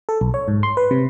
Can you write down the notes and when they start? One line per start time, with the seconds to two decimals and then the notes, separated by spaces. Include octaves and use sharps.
0.09 A4
0.21 B1
0.34 C#5
0.48 G#2
0.63 C6
0.77 B4
0.91 C3